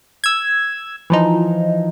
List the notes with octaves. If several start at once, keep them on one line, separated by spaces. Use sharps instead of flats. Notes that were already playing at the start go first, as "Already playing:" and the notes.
E6 G#6
E3 F3 D#4